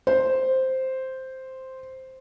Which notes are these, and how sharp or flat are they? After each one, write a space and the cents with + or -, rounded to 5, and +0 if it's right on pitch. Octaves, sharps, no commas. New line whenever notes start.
C5 +0